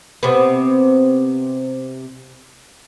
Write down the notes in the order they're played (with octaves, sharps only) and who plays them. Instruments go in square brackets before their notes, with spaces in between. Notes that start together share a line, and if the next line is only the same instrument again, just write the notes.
[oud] C3 B3